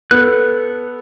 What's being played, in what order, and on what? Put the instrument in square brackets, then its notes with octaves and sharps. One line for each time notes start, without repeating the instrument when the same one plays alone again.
[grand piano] B3 [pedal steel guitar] A4 F#6